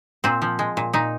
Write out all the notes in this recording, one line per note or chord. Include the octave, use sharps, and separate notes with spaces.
A#2 C4
F3
G#3
A#2
A#2 D#4